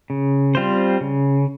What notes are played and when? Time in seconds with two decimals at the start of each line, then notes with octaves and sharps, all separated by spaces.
0.10 C#3
0.55 G3 C4 F4 C5
1.01 C#3